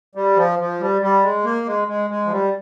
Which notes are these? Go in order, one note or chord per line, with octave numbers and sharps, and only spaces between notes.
G3
F3
F3
G3
G3
G#3
A#3
G#3
G#3
G#3
F3
G3